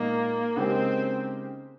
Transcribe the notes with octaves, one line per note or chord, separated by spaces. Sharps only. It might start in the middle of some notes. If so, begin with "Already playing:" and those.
Already playing: A#2 G#3 A#3 D#4
C#3 G#3 C4 D#4 G4 A#4